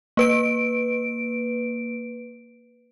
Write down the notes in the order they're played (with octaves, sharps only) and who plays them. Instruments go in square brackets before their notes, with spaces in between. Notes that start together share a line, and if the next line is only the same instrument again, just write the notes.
[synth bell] A#3 B4 D7